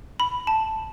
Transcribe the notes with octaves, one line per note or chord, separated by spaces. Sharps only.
B5
A5